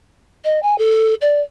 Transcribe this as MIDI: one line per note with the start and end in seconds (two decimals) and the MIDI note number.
0.44 0.61 75
0.62 0.76 80
0.78 1.14 69
1.21 1.40 74